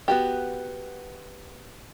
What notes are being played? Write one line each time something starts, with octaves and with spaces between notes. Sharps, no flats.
B3 F#4 G4